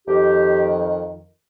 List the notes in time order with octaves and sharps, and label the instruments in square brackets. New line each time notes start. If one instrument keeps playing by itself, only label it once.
[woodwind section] F2 D#3 G4